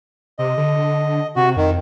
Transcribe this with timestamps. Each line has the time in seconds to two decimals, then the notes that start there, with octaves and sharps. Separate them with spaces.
0.39 C3 D#5
0.57 D3
1.36 C3 F#4
1.56 F2 D#3